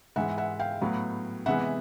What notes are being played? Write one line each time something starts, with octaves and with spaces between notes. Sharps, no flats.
G#2 E3 G#3 E5 F#5
E5 F#5
F5 G5
A2 F#3 B3
C3 E3 G#3 B3 E5 F#5